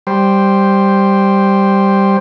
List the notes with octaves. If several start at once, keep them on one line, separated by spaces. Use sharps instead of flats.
G3 C5